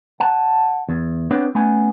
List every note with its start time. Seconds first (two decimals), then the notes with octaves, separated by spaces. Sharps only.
0.20 F#5 A5
0.89 E2
1.31 B3 C4 D4 G4 B4 C#5
1.55 A3 B3 C#4 G#5